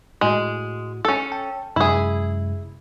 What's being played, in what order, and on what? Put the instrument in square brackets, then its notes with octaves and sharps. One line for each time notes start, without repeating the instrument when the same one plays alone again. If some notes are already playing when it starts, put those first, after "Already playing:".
[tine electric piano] A2 F#4 [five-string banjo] G#3
[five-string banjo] C#4 A4
[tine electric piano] G5 A5
[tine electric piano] F#2 C3 G#3 [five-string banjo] E4 G#4